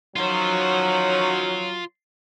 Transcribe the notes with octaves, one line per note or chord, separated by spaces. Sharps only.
D#3 F#3 C#4 D#4 F4 C5